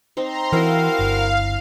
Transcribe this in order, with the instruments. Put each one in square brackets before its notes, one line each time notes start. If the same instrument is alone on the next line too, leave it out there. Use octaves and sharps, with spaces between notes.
[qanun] C4 D#4 C5 [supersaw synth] A#5 C6
[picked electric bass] E3 [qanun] C4 E4 [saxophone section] F#4 A#4 [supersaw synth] F5
[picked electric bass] G1